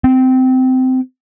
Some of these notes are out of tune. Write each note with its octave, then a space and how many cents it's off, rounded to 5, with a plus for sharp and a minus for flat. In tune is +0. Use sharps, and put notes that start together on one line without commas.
C4 -20